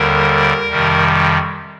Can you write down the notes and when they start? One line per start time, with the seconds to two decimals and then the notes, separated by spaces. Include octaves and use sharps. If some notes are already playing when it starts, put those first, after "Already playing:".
Already playing: D#2 D3 G3 A#4
0.70 F2 C3 D#3 G3